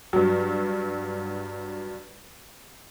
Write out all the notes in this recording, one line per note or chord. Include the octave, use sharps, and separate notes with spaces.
G2 F#3